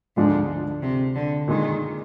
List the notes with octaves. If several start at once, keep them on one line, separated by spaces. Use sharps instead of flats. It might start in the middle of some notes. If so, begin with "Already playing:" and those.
D2 G#2 D3 F3 G#3 D4
C3
D3
A#2 D#3 G#3 D#4